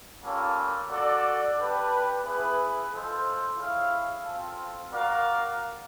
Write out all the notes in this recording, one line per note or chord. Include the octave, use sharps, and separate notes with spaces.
G3 A#3 C#4 F4 A4
F#4 A4 D5
D4 G4 B4
B3 E4 G#4 B4
F4 A4 C5 D#5
E4 G#4 C#5 F5
C4 F4 A4
F#4 A#4 D5 F5